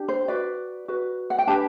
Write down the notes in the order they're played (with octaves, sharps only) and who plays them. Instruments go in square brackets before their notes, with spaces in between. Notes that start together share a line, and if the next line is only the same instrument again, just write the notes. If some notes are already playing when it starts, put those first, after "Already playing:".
Already playing: [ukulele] D4 G4
C5
F#4 B4 D5
F#4 B4
F#5
G5
D4 G4 B4 A5